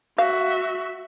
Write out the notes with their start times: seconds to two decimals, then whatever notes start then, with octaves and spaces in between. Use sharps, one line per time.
0.18 F#4 E5 F5